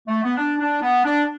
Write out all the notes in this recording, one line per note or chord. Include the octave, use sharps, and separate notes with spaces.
A3
B3
D4
D4
B3
D4